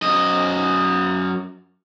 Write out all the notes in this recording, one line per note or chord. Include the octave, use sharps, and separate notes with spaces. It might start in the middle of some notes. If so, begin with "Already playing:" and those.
F#2 D#5